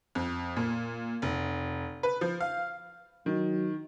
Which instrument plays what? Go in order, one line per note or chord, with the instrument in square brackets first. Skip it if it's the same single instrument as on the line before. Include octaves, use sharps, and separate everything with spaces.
[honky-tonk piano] F2
A#2
F1
B4
F3
F5
[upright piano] D#3 [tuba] F#3